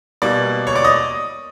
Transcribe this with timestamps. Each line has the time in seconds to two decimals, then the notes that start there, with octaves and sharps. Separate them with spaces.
0.22 B2 G3 A#3 D5 D6
0.67 C#5 C#6
0.76 D5 D6
0.84 D#5 D#6